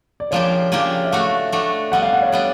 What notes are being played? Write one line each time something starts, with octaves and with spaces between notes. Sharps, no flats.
D5
C#3 F3 A#3 D4 G4 C#5
C#3 F3 A#3 D4 G4
E5
A3 D4 F#4 F5
A3 D4 F#4
G3 B3 D4 F#5
F5
F#5
C#5
G3 B3 D4